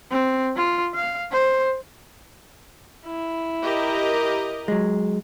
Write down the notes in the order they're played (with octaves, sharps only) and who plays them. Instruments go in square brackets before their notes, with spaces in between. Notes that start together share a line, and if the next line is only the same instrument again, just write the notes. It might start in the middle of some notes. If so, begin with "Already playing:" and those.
[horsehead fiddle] C4
F4
F5
C5
[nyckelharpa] E4
[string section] G4 A#4 D#5
[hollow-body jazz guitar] F#3 G#3